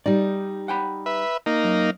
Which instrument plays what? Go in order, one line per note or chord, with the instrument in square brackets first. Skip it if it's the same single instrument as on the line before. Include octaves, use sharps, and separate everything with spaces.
[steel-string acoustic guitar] G3 D#4 [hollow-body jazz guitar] D5
[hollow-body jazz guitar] F#5 G5 B5
[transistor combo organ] B4 E5
A#3 D#4
[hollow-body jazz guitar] F#2